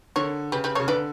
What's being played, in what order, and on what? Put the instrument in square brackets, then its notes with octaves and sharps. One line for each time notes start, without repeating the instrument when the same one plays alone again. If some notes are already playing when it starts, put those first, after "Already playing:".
[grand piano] D3 [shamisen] A#4 C#5
[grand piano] C#3 [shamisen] G4 B4
[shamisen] G4 B4
[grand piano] C#3 [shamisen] A#4 C#5
[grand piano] D3 [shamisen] B4 D5